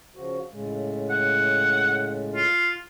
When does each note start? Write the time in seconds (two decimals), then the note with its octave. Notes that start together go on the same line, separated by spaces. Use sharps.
0.16 C#3 F3 F#4
0.51 A2 C#3 G#3
1.10 F#5
2.35 F4